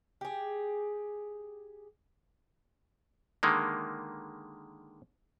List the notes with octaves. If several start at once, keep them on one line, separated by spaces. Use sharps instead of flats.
G4 G#4
D3 D#3 G#3 A#3